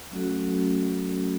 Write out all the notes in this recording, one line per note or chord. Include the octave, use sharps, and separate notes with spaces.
F#3 A3 C#4 F#4 A4